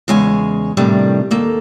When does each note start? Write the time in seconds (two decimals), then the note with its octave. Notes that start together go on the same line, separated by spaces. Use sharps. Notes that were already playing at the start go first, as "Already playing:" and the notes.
0.08 E2 C#3 G#3 C#5 G#5
0.77 A2 C3 D#3 G3 D4
1.31 D#2 A#3 A4